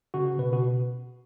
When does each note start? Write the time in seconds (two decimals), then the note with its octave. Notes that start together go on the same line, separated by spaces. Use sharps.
0.14 C#3 F#4
0.38 B2 B4
0.53 F#4